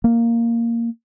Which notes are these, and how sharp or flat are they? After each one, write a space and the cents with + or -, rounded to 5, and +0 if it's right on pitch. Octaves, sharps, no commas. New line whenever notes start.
A#3 -5